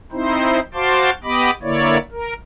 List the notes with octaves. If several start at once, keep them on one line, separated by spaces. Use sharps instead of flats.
C4 D#4 E4 C5
F#4 C5 F5 A5 C6 D6
B3 G4 D#5 B5 D6
D3 A#3 E4 C#5 D5
A#4